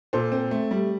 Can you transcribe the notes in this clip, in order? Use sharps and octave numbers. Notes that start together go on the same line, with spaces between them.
A#2 A4 C5
C4
A3
G3